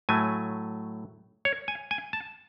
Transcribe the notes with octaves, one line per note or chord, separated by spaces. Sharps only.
A2 F#3 A3 G#5
C#5
G#5
G#5
A5